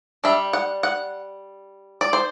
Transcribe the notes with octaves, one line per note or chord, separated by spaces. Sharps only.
G3 D4 E5
F#5
F#5
D5
C5